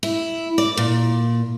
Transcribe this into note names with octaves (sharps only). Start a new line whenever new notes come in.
E4
D5
A#2